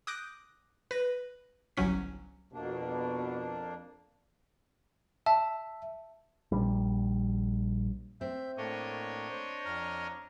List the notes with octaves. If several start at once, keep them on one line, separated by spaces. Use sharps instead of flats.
D6 D#6 F#6 G6 A#6 D7
B4 A#6
G1 C2 F#3 C#4 B6
F2 B2 A#3 D4
E5 A5
A#1 G3
C4 E5 G6
A2 A3 A#3 D4 C#5 D#5
C5
F2 A#5 F6